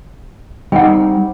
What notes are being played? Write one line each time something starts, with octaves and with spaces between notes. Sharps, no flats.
G3 C4 D#4 F#5 G5